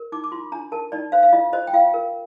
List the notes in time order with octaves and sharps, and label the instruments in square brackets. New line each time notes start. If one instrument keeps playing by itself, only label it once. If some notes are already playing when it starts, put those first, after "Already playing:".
Already playing: [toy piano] A#4
D#4 D6
D6
F4 C6
D4 A#5
A#4 A5
D#4 D5
C5 F5
F5
F4 D#5
C5 D#5
G5
F4 F5
A#4